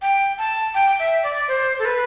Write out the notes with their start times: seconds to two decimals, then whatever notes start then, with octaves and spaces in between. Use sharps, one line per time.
0.02 G5
0.38 A5
0.74 G5
0.99 E5
1.23 D5
1.48 C5
1.79 A4
1.85 B4